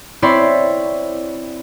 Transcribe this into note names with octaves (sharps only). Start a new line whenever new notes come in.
C4 E4 C#5 D5 B5 C6